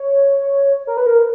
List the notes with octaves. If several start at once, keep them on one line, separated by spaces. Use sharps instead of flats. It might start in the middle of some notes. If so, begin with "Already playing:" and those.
Already playing: C#5
A#4
B4
A#4